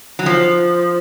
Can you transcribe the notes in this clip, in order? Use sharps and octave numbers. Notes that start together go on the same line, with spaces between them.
F#3
F3